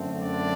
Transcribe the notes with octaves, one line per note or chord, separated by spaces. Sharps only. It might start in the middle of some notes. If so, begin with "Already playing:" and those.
Already playing: F#2 D3 A3 C4
D4 D5